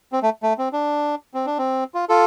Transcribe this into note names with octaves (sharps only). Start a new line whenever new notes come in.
C4
A3
A3
C4
D4
C4
D4
C4
F4
F4 A4